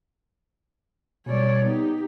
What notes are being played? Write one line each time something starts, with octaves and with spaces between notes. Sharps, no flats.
B2 G3 C#5 D5
B3 D#4 G4